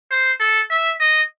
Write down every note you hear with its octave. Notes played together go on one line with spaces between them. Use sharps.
C5
A4
E5
D#5